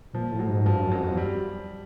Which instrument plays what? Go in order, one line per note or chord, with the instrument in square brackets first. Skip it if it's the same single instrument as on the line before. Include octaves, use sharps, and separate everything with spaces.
[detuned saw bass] A#2 [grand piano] F3
[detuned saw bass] A2
[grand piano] F#3
[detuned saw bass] G#2
[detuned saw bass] G2 [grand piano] F3
[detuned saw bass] F#2
[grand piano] F#3
[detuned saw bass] F2
E2
[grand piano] G3